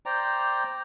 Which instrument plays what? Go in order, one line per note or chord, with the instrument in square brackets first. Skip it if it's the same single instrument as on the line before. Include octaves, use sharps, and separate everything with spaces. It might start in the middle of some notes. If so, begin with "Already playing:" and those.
[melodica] C5 D5 G5 A#5